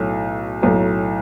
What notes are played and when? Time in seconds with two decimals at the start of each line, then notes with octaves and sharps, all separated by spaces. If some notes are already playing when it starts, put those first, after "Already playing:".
Already playing: B1 A2 F#3
0.62 B1 A2 F#3